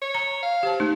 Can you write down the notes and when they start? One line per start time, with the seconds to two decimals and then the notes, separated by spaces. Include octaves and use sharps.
0.02 C#5
0.15 A#5
0.43 F5
0.63 G4 C5 A5
0.80 A3 D#4